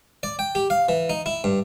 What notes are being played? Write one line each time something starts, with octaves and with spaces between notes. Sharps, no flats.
D5
G5
G4
F5
E3
D#4
E4
G2